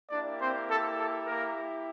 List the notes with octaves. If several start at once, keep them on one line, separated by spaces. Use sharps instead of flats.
A#3 D4 E4 G4 D5
C4 C5
A4
A4
A#3 A#4